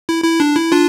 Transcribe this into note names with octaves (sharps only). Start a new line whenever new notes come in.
E4
E4
D4
E4
D4 F4